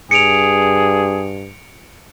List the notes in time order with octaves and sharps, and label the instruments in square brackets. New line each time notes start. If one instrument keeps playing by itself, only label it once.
[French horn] G2 [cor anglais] G#4 [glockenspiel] C#7 D7 F7